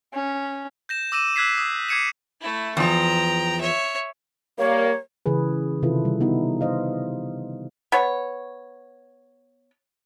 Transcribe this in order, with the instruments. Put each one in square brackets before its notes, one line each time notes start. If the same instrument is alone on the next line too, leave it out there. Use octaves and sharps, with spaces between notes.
[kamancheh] C#4
[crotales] G6 A#6 E7
D6 E6 A#6 D#7 E7
E6 F#6 G#6 B6 C7
D#6 E6
D6 G#6 C7 C#7 D#7 E7
[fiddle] A3 E4
[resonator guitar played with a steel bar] E2 F3 [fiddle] G5 A#5
[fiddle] C#5 E5
[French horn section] G3 A#3 [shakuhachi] C#5
[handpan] C#3 E3 G#4 B4
C3 D#3 E4 F4 A4 B4
G3
B3 D#4 E4
C5 D#5 F5
[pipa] B3 C#5